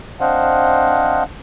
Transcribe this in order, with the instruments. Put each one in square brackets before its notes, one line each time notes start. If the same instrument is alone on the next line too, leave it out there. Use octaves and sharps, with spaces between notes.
[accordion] C4 D4 C5 D#5 F5 F#5